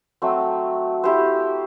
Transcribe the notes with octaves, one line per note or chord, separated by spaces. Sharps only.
F#3 A3 C4
E4 G4 C5